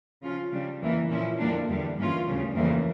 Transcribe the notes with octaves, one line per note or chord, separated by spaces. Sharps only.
C#3 F3 C#4 F4
C#3 G3 D4
F2 E3 A#3
A#2 F3 C#4 E4
F2 D3 G3 A#3 D4
E2 D3 G3
G2 E3 A#3 C#4 F4
D2 C#3 G3
F2 C#3 E3 A#3